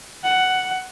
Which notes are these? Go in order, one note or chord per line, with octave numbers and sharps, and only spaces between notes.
F#5